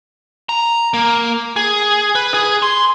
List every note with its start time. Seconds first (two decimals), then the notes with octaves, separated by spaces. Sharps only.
0.49 A#5
0.94 A#3
1.56 G#4
2.15 B4
2.34 G#4
2.62 C6